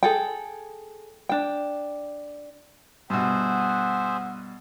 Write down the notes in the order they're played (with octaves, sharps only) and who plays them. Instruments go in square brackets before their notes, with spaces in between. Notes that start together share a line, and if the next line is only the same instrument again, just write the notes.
[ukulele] G#4 A4 G5
D4 G5
[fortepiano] G2 B2 [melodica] G#4 C5 E5 [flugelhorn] F#5